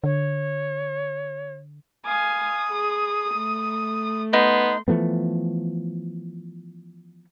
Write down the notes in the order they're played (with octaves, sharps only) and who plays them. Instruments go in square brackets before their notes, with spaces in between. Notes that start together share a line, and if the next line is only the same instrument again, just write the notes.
[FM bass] D3 [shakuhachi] C#5
[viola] F5 G#5 [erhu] D#6
[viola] G#4
A3
[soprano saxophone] B3 [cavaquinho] D#4 [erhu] C6
[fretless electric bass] E3 F3 A3 B3